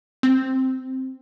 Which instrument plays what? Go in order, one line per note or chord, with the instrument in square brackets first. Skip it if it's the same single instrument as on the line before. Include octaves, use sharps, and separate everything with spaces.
[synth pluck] C4